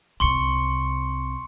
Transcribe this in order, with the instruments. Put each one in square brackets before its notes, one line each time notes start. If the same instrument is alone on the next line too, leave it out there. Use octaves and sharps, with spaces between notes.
[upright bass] C2 C3 [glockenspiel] C6 C#6 C#7